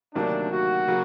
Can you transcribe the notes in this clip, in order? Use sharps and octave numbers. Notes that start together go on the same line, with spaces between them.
D2 C3 D#3 F#3 A#3 D4
F#4
C#3 F#3 A#3